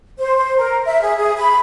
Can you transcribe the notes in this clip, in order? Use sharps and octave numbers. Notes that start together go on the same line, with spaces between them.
C5
C5
A#4
E5
G#4
G#4
B5